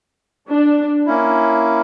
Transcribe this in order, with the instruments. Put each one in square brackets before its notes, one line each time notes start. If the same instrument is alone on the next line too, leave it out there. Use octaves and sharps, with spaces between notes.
[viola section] D4
[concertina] A#3 C#4 E4